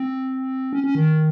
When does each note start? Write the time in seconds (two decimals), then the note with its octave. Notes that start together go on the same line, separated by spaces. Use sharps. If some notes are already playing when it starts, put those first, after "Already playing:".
Already playing: C4
0.73 C#4
0.84 C#4
0.95 D#3